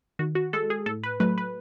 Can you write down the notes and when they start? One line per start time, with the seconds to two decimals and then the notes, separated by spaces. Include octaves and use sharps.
0.19 D#3 F#4
0.35 F#4
0.53 G#3 A4
0.70 G#4
0.86 A2 A4
1.03 B4
1.20 F#3 A3 B4
1.38 B4